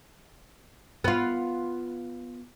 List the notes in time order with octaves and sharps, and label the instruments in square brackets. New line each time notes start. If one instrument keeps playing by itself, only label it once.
[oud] B3 F4